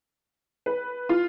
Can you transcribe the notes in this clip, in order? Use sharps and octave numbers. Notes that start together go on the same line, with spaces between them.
B4
F4